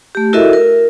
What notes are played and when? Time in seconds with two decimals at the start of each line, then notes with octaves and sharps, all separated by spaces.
0.15 A3 G4
0.33 E4 F#4 A4 A#4 D#5 E5
0.53 A#4